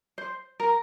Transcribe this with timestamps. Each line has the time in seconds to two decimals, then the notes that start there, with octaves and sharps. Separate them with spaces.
0.18 C5
0.60 A#4